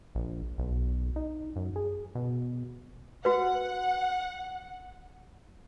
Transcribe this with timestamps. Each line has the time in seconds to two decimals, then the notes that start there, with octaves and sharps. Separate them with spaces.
0.15 A#1
0.58 B1
1.16 D#4
1.56 F#2
1.76 G#4
2.15 B2
3.25 F#4 B4 F#5